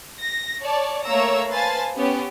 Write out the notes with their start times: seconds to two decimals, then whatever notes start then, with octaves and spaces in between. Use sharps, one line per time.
0.19 A#6
0.63 C#5 D5 A5
1.05 A3 A#3 C#5 A#5 E6
1.50 B4 C5 F5 G#5 A5 A6
1.96 B3 C#4 G4